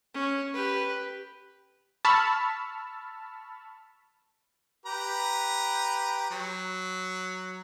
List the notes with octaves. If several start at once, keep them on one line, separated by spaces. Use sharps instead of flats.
C#4
G4 B4
A5 B5 C#6 E6 F6
G4 B4 A#5
F#3